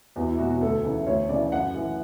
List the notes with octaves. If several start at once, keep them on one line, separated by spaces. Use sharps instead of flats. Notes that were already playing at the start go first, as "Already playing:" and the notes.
E2 F#4
E4
B2 F#4
F#4
D2 A4
C#3 E3
D2 C#5
C#3 E3 D5
F#2 F#5
E3